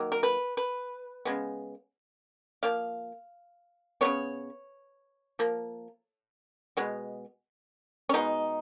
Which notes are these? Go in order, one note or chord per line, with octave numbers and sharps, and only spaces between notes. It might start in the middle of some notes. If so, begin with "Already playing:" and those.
Already playing: D#3 F#3 A#3
A#4
B4
B4
C#3 G#3 B3
F3 A#3 F5
C#3 G#3 B3 C#5
F3 A#3
B2 G#3 B3
C#4
B2 G#3 B3 D#4